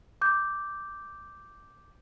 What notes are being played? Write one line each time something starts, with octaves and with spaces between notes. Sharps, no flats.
D6 G6